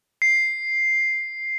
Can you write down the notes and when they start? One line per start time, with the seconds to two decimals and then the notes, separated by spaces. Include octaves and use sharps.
0.22 C7